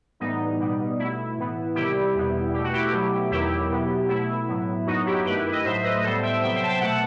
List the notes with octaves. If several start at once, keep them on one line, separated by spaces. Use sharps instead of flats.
A2 E3 G3 B3 D#4
B2 G3 B3
B2 A3 E4
A2 E3 B3
C3 D#3 G3 E4 G4
E2 B2 G3 B3
B2 A3 G4
F#4
E4 G4
B2 F#3 A3
E2 D#3 F#3 B3 E4 G4
B2 F#3 B3
B2 A3 E4
A2 F#3 B3
F#2 F#3 B3 D#4 F#4
E4 G4
G2 D#3 A3 G4 B4
E4 G4
B4 D#5
A2 F#3 A3 C5 E5
B4 D#5
A2 G3 B3 A4 C5
E5 G5
C3 F#3 B3 E5 G5
C5 E5
A5
E5 G5
B2 A3 F#5 A5